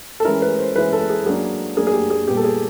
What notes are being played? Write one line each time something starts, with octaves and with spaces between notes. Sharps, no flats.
A4
E3 G#3 C#4 E4 A#4
B4
C5
E3 G#3 C#4 E4 B4
A4
G#4
F#3 A#3 D4 G#4
F#3 A#3 D4 G#4
G#4
G4
G#4
A#2 G3 B3 G4
A4
G#4